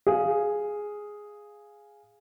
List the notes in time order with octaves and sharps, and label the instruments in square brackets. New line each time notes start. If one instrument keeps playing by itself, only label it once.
[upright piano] G#4 F5